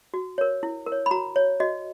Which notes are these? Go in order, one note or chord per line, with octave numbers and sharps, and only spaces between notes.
F#4
A#4 C#5
E4
A#4
C#5
B5
F#4 A#5
C#5
F#4 D#5